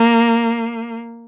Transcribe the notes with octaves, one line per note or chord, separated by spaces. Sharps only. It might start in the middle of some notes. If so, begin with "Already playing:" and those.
Already playing: A#3